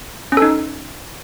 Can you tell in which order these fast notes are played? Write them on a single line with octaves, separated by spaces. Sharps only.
C#4 A4 D#4